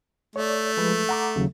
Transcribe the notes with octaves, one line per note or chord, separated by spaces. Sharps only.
A3 C#5 D5
F3 G#3 B4
F#5 A#5 D6
D#2 C#3 F#3